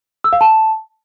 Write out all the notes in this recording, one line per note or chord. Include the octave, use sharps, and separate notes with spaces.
E6
F5
A5